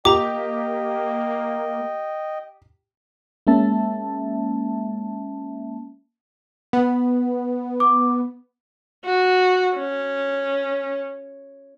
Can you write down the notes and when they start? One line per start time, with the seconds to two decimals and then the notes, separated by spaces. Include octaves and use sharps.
0.05 A#3 G4 D#5 G5 A#5 D6
3.47 G#3 A#3 C#4 E5 A5
6.73 B3
7.80 D6
9.05 F#4
9.77 C#4